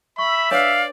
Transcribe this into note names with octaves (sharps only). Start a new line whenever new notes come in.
E5 B5 C#6
D4 B4 C#5 D5 F5